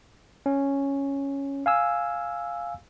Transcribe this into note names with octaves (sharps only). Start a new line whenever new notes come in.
C#4
F5 G#5 E6